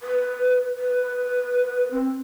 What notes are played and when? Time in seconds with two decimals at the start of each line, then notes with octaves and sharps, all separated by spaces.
0.01 B4
0.77 B4
1.91 C4